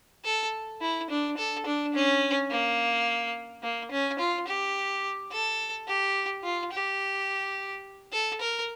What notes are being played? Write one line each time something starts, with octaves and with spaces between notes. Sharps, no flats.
A4
E4
D4
A4
D4
C#4
A#3
A#3
C#4
F4
G4
A4
G4
F4
G4
A4
A#4